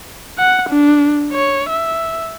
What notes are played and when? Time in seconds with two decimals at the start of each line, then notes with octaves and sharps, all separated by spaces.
0.39 F#5
0.70 D4
1.33 C#5
1.69 E5